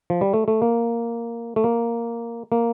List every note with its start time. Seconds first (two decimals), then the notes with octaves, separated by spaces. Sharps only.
0.10 F3
0.21 G3
0.33 A3
0.48 A3
0.62 A#3
1.56 A3
1.64 A#3
2.52 A#3